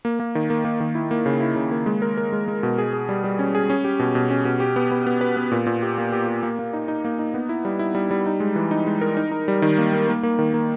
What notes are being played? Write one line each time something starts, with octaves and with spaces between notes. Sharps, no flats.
A#3
A#3
D#3
A#3
A#3
D#3
E4
A#3
C#3
E4
C#3
A#3
G#3
A#4
A#4
G#3
G#3
B2
G#4
G#4
G3
G3
C#4
G#4
C#4
G4
B2
B2
C#4
B2
G4
B3
B3
B3
B4
B3
A#2
A#2
G4
A#3
G4
G4
A#3
A#3
D#4
D#4
A#3
D#4
B3
E4
G3
E4
G3
G3
D#4
G#3
E3
D#4
G#3
A#4
D#4
D#4
G3
D#3
A#3
A#3
A#3
A#3
D#3
A#3